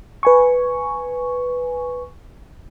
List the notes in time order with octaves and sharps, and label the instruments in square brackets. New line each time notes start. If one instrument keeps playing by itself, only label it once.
[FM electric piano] B4 G#5 C#6